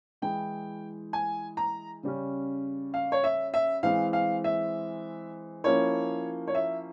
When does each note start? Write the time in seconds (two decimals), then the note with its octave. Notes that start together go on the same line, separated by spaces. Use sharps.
0.22 E3 G#3 E4 G5
1.13 G#5
1.57 A#5
2.03 C#3 G3 C#4
2.94 F5
3.12 C#5
3.24 E5
3.54 E5
3.83 E3 G#3 C4 F5
4.13 F5
4.44 E5
5.64 F3 A#3 C#4 E4 C#5
6.48 C#5
6.55 E5